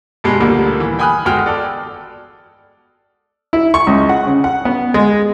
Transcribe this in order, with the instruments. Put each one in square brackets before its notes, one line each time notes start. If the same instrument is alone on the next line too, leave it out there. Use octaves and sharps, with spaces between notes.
[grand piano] G2 B2 G3 G#3
D2 A#2 D3 G3 A#3
E3
G5 G#5 B5 D#6 F6 F#6
G1 G#3 F#4 G5 F6
A4 D5
[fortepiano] E4
C#6
C#2
F#5
C#3
F#5
B3
G#3